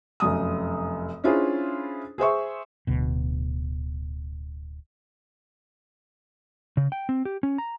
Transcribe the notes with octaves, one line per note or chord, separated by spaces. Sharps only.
F1 F#2 D#6
C#4 D4 E4 F4 G#4 C5
G#4 C5 E5 C#6
D1 D2 B2
C#3
G5
C4
G4
C#4
A#5